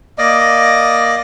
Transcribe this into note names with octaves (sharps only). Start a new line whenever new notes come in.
A#3 D5 D#5